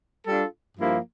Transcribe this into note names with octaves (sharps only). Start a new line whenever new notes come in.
G3 D4 F4 A4
G2 F3 A#3 E4